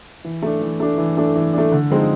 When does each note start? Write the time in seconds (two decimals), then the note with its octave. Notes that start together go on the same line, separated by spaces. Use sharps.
0.24 E3
0.42 A3 D4
0.61 E3
0.80 A3 D4
0.98 E3
1.17 A3 D4
1.36 E3
1.53 A3 D4
1.72 D3
1.90 F3 G#3 C4 D#4